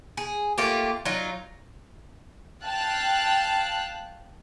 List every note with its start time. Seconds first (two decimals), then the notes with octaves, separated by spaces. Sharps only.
0.17 G#4
0.58 A3 A#3 F4 G4
1.05 F#3 D#4 F4
2.65 F5 G5 A5 F#6